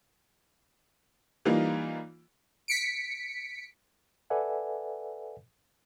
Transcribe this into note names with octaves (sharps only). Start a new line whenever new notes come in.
E3 G3 A#3 D#4 F4
B6 C#7 D7
A4 B4 D5 E5 F#5 G#5